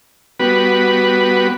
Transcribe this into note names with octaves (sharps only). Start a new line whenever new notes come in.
G3 B3 F#4 B4